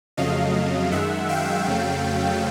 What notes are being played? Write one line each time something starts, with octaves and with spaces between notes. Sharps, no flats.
F2 C#3 F#3 A3 D#5 F5
F#2 D#3 G#3 E5 F#5
F5 G5
F2 C#3 F#3 A3